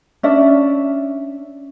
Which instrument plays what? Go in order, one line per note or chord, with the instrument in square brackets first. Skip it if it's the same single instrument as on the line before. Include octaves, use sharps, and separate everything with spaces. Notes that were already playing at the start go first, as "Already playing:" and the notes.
[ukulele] C#4 D4 D5 E5